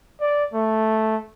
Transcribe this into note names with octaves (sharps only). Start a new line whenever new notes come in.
D5
A3